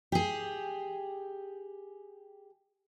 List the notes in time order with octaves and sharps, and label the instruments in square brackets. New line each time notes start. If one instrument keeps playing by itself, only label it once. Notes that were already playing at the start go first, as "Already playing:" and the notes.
[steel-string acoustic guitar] G4 G#4